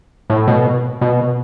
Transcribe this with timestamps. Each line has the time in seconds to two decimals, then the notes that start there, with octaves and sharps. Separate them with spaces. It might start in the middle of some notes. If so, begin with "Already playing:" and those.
0.30 A2
0.48 B2
1.01 B2